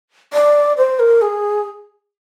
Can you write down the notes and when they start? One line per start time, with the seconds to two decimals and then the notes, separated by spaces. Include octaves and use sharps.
0.33 D5
0.77 C5
0.99 A#4
1.21 G#4